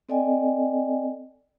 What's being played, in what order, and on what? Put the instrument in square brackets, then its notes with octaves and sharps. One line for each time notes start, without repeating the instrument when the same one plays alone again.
[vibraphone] C4 A4 D5 D#5 G5 G#5